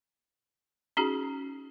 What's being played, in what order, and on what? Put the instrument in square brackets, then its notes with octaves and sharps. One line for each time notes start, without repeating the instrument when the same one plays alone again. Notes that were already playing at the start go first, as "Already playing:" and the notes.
[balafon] C#4 D#4 F#4 G#4